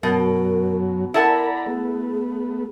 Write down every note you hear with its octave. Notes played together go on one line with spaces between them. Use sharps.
F#2 B2 F#3 A#4
E4 A4 A#4 D5 F#5 A#5 B5
A3 B3 G#4